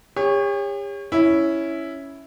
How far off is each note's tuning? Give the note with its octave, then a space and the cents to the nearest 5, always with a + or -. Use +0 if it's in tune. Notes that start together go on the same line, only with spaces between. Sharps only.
G4 +45 C#5 -5
C#4 +0 E4 -5